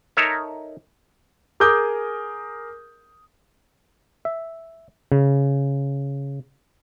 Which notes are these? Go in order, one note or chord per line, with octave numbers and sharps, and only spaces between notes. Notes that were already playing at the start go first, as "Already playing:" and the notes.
D#4 A4 A#4 C#5 E5
G#4 A#4 D6 D#6 G6
E5
C#3